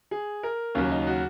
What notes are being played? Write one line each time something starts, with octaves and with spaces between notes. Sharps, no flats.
G#4
A#4
D#2 C#3 F#3 C#4
D#4
F#4